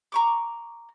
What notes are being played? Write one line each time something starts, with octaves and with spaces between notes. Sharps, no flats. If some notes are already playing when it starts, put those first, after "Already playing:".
A#5 C#6 D6